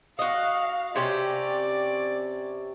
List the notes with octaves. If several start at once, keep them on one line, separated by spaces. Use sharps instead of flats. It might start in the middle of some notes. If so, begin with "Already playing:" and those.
F#4 D#5 F5
C3 C#4 G4 D5